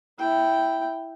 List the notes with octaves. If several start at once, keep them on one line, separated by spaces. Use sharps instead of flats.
E4 G5